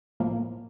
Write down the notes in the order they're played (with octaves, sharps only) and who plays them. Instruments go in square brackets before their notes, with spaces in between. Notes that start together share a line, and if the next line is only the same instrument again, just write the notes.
[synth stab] A2 F3 A#3